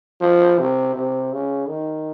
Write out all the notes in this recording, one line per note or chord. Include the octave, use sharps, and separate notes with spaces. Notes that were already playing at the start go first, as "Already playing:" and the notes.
F3
C3
C3
C#3
D#3